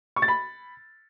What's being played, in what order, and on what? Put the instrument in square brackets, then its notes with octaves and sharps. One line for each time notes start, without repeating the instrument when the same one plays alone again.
[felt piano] C#6
A6
B5